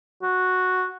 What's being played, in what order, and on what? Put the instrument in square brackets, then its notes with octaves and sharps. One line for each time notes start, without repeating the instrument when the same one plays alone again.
[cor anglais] F#4